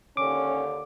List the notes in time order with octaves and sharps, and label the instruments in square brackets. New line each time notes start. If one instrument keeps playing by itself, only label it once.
[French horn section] D#2 D3 [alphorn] C#4 [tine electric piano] D6